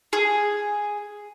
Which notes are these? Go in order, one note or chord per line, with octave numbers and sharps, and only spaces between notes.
G#4